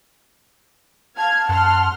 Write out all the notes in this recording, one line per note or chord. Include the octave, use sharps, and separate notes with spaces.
F5 A5 F6 G#6
F#2 F#5 C6 F6